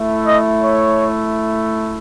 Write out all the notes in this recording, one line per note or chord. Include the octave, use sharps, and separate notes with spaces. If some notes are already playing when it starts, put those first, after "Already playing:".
Already playing: A3 E4
D#5
C#5